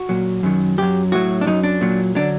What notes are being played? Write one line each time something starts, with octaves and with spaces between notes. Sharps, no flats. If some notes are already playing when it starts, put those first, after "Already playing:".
Already playing: F#4
A#2 F#3
F#2 D#3 F#3
F#2 F#3 G4
A2 F#3 F#4
D4
F#2 F#3 D#4
D4
A#2 F#3
D3 F#3 D4